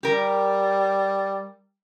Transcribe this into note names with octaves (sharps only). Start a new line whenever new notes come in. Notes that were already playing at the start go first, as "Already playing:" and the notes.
G3 G4 A#4